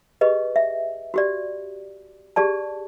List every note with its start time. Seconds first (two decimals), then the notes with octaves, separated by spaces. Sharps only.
0.21 G4 G#4 B4 D#5
0.56 E5
1.14 F#4 G4 D5
2.36 G4 G#4 D5 A5